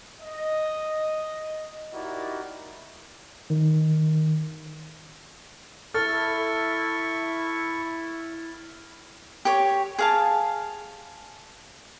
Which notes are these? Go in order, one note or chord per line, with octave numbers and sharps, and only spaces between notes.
D#5
D#4 E4 F#4 G4 A#4 D5
D#3
E4 A4 C#6 F6 A6
G4 C#5
G#4 F5 A5